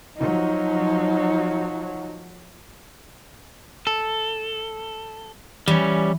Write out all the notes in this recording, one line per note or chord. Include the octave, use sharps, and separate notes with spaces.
F3 F#3 D#4
A4
E3 G3 C#4